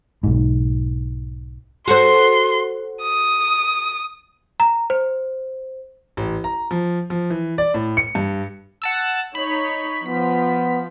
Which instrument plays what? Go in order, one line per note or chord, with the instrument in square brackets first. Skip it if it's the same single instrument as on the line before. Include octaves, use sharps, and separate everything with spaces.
[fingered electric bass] B1 G#2
[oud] F#4 A4 C5 [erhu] C6
[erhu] D#6
[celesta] A#5
C5
[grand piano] A1
A#5
F3
F3
E3
D5
A2
C#7
G2
[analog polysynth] F#5 A5 E6
[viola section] D#4 C#5 [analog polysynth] B5
[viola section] F3 [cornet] B3 [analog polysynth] B6